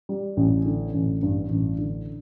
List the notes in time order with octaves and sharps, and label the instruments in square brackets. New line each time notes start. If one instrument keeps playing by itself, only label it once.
[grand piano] G3
A1
D3
A1
G2
A1
D3